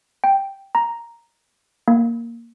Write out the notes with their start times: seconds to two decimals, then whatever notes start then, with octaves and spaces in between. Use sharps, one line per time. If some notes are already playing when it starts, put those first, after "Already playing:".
0.24 G5
0.75 A#5
1.88 A#3